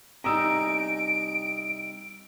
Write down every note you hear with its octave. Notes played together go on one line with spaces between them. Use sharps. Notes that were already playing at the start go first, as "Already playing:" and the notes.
C3 G3 D#4 A#5 D#6 E6 D7